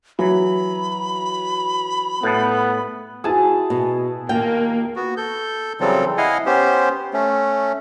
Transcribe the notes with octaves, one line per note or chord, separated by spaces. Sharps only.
E3 F#3 B5
A2 B3 A5
E4 F#4 G#4 A5
B2
D#2 A#3 F4 G5
B3 F#4
A4 G6
C#3 E3 F#3 G3 C4 A4
E4 D#5 F5 F#5 G#5
B3 C#4 G4 C5
A3 C#4